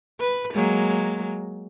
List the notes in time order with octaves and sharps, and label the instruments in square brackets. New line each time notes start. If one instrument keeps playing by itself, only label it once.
[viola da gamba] B4
F#3 G#3 A#3